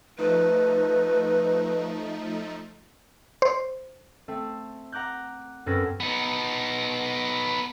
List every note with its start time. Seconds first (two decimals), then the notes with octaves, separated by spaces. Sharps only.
0.18 F3 A3 D#4 B4
3.42 C5
4.28 A3 C4
4.92 F#5 A#5 D6 F#6 G6
5.66 F#2 C4 C#4 A4 B4 A#6
6.00 B3 D#4